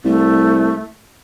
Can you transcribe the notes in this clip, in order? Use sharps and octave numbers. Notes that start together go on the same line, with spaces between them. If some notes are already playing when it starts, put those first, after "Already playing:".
C2 A3